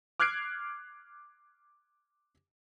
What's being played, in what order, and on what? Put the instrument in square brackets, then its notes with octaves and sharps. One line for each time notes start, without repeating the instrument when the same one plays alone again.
[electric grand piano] D6 F6 F#6 G#6 C7 D7